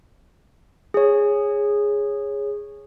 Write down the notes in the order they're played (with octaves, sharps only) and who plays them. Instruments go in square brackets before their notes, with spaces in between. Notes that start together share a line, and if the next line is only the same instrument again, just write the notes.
[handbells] G#4 C#5